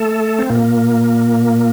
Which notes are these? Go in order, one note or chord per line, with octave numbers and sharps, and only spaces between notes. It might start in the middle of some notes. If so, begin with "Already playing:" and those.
Already playing: A3 A4
C4
A#2 A#3